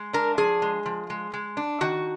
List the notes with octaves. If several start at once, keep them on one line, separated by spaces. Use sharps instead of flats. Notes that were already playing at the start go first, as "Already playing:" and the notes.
Already playing: G#3
D4 A#4
F3 G#4
G#3
F3
G#3
G#3
D4
D#3 F#4